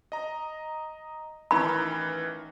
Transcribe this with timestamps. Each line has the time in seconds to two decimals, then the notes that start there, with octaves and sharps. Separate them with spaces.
0.12 D#5 A#5
1.51 A1 D#3 E3 B5